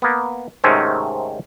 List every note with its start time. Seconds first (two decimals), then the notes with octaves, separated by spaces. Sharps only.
0.02 A#3 B3
0.64 G#2 C3 D#3 A3 C4 C#4